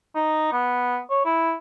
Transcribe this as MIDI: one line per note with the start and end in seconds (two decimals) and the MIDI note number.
0.15 0.52 63
0.52 0.99 59
1.10 1.21 73
1.25 1.55 64